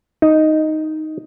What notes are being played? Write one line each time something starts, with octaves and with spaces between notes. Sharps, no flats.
D#4